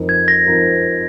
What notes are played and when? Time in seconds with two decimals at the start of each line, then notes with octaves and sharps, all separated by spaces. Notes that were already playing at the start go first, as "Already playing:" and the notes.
Already playing: F2 F3 C4 D#4 A#4
0.09 G#6
0.28 A#6
0.46 F3 C4 D#4 A#4